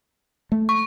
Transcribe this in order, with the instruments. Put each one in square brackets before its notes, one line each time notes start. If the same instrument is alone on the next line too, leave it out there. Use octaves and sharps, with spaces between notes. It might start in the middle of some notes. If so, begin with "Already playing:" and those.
[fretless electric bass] A3
[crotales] C#6